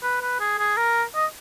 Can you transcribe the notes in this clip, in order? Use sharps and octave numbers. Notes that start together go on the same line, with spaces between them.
B4
B4
G#4
G#4
A#4
D#5